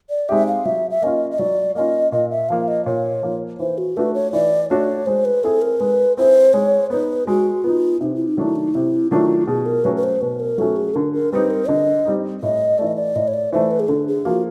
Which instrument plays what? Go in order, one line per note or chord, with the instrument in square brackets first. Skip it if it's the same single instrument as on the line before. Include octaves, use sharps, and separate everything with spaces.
[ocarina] D5
[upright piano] G#3 C4 D#4 G4 [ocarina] E5
[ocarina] F5
[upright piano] F#3 [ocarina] E5
[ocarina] E5
[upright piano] A#3 C#4 F4 [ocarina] D#5
[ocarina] D#5
[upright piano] F#3 [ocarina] D5
[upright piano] A#3 C#4 F4 [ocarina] D#5
[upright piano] A#2 [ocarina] D#5
[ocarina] E5
[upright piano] F3 A#3 [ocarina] F5
[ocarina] D#5
[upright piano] A#2 [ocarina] C#5
[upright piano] F3 A#3
[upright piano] E3 [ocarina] C5
[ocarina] F#4
[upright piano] A3 D4 F#4 [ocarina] B4
[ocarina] C#5
[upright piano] E3 [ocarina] D5
[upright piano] A3 D4 F#4 [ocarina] C#5
[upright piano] G#3 [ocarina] C5
[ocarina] B4
[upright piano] C4 E4 G#4 [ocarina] A4
[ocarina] A#4
[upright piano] G#3 [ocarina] B4
[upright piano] C4 E4 G#4 [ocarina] C5
[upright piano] G#3 [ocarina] C#5
[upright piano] B3 D#4 [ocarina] B4
[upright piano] G#3 [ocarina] F#4
[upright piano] B3 D#4 [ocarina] F4
[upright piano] C3 [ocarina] D#4
[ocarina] E4
D#4
[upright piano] D#3 F#3 A3 D4 [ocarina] E4
[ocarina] D#4
[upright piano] C3 [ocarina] E4
[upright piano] D#3 F#3 A3 D4 [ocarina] F4
[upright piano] B2 [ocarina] G#4
[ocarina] A#4
[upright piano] F#3 A3 C#4 F#4 [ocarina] B4
[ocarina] B4
C5
[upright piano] B2 [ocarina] B4
[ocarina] A#4
[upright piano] F#3 A3 C#4 F#4 [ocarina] A4
[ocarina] G#4
[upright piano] D3 [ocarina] A#4
[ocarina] A#4
[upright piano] G3 C4 D#4 [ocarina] B4
[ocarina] A#4
[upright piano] D3 [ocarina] D#5
[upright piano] G3 C4 D#4
[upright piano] A2 [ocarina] D#5
[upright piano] E3 A3 [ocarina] D5
[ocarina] D#5
D5
[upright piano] A2 [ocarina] D#5
[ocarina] C#5
D5
[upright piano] E3 A3 [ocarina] C5
[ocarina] B4
G#4
[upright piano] D3 [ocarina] A4
[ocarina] G#4
[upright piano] F3 A#3 [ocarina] F#4